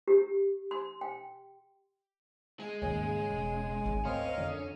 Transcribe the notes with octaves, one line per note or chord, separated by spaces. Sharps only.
G4
C6
G5
G#3 G#5
D#2 G#2 C#3 G#5
E1
G#1 D#4
D2 C4 C#4 A#4 D#5 F5
F2 D3